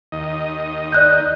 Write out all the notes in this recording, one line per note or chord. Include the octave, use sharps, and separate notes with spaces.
D#2 D#5
D5 F#6 G6